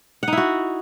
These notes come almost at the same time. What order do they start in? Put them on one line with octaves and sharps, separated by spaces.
F#5 D#4 E4 F#4